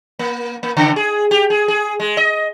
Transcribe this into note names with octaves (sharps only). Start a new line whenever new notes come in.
A#3
A#3
C#3
G#4
G4
G#4
G#4
G#3
D#5